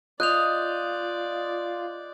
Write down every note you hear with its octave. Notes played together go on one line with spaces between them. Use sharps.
F4 D5 D#5 F#6 G6 F7